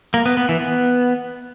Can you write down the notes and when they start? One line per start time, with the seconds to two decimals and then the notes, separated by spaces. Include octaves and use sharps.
0.14 A#3
0.26 B3
0.37 B3
0.49 E3
0.60 B3